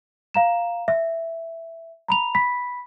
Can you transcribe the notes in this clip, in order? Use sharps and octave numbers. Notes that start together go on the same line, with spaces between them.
F5 A#5 E7
E5
A#5 B5 F7
B5 B6